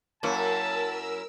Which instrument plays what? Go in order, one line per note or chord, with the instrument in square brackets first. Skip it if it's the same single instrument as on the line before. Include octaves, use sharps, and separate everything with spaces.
[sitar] F#2 E4 [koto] F#3 A#3 [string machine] A#4 E6 [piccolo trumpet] A5